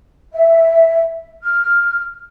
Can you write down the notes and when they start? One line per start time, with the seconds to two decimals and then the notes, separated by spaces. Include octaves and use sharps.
0.34 E5
1.43 F6